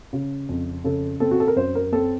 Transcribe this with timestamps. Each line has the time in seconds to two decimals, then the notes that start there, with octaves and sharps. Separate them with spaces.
0.13 C#3
0.49 F2
0.84 C#3 A4
1.20 C4 A4
1.31 F#4
1.40 A4
1.48 A#4
1.56 F#2 C5
1.75 A#4
1.92 C4 A4